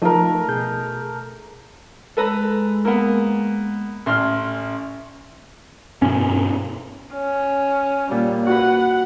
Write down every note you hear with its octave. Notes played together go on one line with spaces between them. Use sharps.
F3 A3 D#4 A#4
B2 G#4 G6
G#3 A4 B4 A#5
A#3 B3
A1 C6 F6
C#4
G2 B2 C#4
C#4
A#2 G3
F#4 B4 F#5